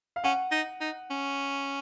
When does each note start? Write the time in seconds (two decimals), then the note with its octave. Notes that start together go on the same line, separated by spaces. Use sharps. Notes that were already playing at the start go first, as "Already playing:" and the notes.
0.16 F5
0.24 C#4 F#5
0.52 D#4
0.81 D#4
1.11 C#4